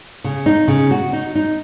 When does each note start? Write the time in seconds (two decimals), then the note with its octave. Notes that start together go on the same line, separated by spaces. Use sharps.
0.24 C#3
0.46 D#4
0.68 C#3
0.91 F#4
1.13 D#4
1.35 D#4